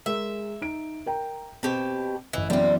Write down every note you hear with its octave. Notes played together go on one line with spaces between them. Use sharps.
G#3 G#4 A#4 E5
D#4 D7
A#4 G5 A#5
B2 C4 G4 A5
A1 E3 D#5
F#2 E3 G3 B3 C4